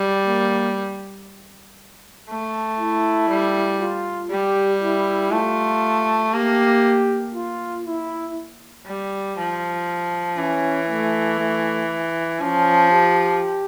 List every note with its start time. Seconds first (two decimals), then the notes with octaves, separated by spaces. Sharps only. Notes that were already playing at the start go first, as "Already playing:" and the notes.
Already playing: G3
0.26 A#3
2.29 A3
2.79 E4
3.29 G3
3.80 F4
4.31 G3 G4
4.82 E4
5.31 A3 F4
6.33 A#3 G4
7.35 F4
7.85 E4
8.86 G3
9.38 F3
10.38 E3 C#4
10.89 A3
11.40 A3
12.41 F3 C#4
12.91 G4